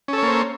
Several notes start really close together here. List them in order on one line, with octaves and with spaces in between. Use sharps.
C#4 A4 C#5 A#3 C5